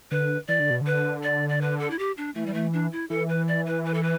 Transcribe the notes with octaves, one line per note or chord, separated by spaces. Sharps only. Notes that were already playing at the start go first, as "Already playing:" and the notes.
D3 B4
E3 D5
D3
B2
D3
B4
D5
D5
B4
A4
E4
G4
D4
E3 A3
G3
A3
D4
E4
E3 A4
B4
D5
B4
B4
A4
B4